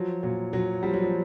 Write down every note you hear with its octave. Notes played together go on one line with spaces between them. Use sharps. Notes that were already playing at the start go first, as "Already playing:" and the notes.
Already playing: F3 F#3
A#2 F#3
A#2 F#3
F3 G3
F#3
F3